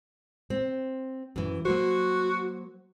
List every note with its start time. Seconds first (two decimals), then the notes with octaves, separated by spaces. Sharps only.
0.50 C4
1.36 F#2 E3
1.65 F#3 A#3 F#4 C5